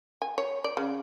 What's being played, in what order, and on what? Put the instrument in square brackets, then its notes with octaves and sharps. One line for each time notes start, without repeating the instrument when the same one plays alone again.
[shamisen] G#5
C#5
D5
C#3